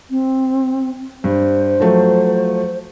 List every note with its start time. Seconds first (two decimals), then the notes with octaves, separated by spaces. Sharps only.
0.11 C4
1.24 G2 C5
1.80 F3 F#3 A3